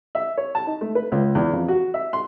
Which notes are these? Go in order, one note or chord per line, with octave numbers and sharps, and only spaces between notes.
E5
C#5
A5
D#4
A3
B4
C#2
E2
F2
F#4
E5
C6